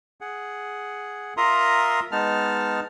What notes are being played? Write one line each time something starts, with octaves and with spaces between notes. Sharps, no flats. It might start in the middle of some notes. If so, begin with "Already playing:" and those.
G#4 F#5
F4 A#4 E5 A#5 C6 D#6
G#3 B3 D#4 A5 F6